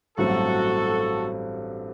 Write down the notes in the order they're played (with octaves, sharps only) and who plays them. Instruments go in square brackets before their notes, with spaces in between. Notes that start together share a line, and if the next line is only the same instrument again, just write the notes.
[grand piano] A1 G2 F#3 A3 C4 [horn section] F#4 A4